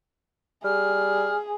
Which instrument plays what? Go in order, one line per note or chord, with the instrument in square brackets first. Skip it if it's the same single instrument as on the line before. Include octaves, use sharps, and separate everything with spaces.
[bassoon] G3 [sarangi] G#4 [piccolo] F6